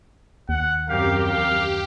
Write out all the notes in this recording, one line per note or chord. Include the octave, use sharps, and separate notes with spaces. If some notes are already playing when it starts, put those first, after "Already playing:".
D#2 F#5
F#2 C4 G4 A#4 F5
F5